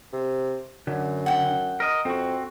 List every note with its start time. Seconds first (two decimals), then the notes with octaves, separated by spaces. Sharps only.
0.13 C3
0.87 F#2 D3
1.26 F#5 G5
1.80 A#4 D#5
2.05 F2 C4 F#4